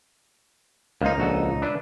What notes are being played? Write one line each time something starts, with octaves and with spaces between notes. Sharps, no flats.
C#2 A#3 D#4 C5
A#1 F#4 A4
D4 B4 E5